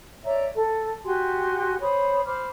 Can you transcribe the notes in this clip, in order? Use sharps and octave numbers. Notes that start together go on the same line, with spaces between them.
C#5 D5 E5 A#5
A4
F#4 G4 G#5 C6
C5 C#5 B5 D#6
C5 B5 D6 F6